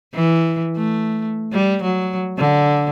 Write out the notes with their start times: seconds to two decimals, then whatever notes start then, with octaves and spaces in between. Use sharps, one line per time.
0.14 E3
0.76 A3
1.53 G3
1.83 F#3
2.38 D3